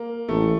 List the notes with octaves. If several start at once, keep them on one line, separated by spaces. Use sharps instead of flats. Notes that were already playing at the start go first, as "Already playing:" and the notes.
Already playing: A#3
A1 A3